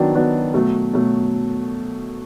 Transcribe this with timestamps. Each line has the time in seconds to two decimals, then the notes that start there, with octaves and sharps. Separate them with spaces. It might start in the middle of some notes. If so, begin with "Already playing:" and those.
Already playing: D#3 F#3 B3 D4 F#4
0.15 D#3 F#3 B3 D4 F#4
0.54 B2 F#3 A3
0.93 B2 F#3 A3